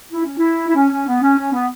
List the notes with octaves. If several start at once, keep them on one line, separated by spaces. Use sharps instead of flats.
E4
C#4
E4
E4
C#4
C#4
B3
C#4
C#4
B3